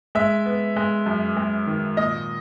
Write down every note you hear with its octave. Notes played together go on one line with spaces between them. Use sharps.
G#3 E5
B3
G#3
F#2
G#3
D#3
A#2 D#5